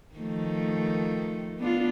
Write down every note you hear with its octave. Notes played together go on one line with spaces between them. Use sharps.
D#3 F3 A3
B3 D4 F4